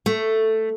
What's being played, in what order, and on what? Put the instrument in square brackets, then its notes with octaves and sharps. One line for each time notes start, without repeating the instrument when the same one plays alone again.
[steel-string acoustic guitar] A3